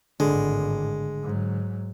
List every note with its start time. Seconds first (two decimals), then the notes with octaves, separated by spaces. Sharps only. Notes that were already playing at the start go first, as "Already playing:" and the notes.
0.20 G#1 A2 D3 G#3
1.23 G#2 F#3